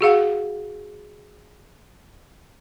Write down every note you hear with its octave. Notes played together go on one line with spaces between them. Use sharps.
F#4 G#4 F5 F#5